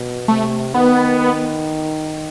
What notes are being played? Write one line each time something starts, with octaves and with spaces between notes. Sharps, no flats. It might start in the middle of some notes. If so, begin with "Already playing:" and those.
Already playing: B2
C3 A3
D#3 B3